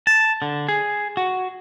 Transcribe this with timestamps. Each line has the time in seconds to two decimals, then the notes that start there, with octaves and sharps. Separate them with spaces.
0.07 A5
0.42 D3
0.68 G#4
1.17 F#4